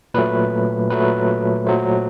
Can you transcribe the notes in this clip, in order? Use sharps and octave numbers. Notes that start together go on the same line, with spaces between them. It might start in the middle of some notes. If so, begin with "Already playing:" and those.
A#2 F#3 A3 B4
A#2 F#3 A3 B4
A#2 F#3 A3 C5